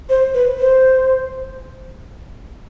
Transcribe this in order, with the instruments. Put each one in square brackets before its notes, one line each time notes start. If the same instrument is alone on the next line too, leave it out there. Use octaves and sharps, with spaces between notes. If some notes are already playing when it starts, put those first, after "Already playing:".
[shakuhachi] C5
B4
C5